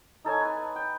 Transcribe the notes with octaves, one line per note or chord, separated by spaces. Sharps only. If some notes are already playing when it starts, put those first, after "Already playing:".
D#4 A4 C#5 G#5
B4 G#5
G5